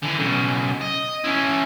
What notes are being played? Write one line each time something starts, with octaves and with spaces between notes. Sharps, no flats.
D3 E3
B1 C#3
D#5
C#4 E4